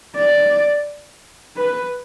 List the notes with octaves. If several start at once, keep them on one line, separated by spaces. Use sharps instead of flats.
D5
B4